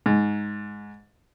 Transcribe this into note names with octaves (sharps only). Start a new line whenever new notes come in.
G#2